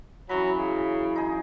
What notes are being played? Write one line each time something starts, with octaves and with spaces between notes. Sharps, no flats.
F#2 E3 F#3 B5
C#3
D#4 G#4